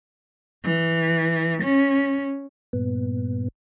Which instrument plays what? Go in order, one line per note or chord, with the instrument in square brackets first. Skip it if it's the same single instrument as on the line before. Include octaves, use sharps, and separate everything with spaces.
[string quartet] E3
C#4
[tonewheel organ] G2 A#2 B3